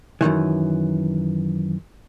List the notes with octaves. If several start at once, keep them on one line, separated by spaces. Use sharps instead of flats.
F#2 A#2 D#3 E3